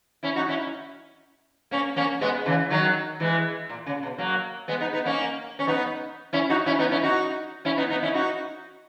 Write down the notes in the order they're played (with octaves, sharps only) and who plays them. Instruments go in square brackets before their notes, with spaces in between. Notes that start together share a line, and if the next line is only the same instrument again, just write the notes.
[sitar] C#4 E4
D#4 F#4
C#4 E4
A#3 C#4
A#3 C#4
G#3 B3
C#3 E3
D#3 F#3
E3 G#3
A#2
C#3
B2
F#3 A#3
G#3 B3
B3 D#4
B3 D#4
A#3 C#4
C#4
B3 D#4
C#4 E4
D#4 F#4
C#4 E4
B3 D#4
C#4 E4
D#4 F#4
C#4 E4
B3 D#4
B3 D#4
C#4 E4
D#4 F#4